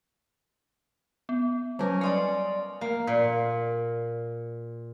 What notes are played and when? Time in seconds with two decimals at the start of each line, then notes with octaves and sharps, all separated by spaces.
1.29 B3
1.79 F#3 G3 C#4 A#4
2.01 D5 D#5 F5 G#5 C6
2.81 A#3
3.07 A#2